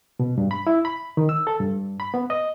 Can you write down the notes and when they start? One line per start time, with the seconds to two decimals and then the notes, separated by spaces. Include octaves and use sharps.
0.20 B2
0.38 G2
0.51 B5
0.67 E4
0.85 B5
1.17 D#3
1.29 E6
1.47 A4
1.60 G2
2.00 B5
2.14 B3
2.30 D#5